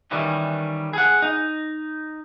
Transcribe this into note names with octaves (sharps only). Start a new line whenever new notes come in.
D#3 E3 G3 C#4
G#4 F#5
D#4